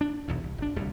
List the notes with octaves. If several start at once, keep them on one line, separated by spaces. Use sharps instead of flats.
D4
B1 E2 A2
C2
G#1 D4
D1 C2 A2 G3